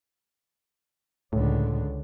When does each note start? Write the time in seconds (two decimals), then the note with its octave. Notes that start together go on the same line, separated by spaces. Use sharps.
1.33 C#2 A2 D3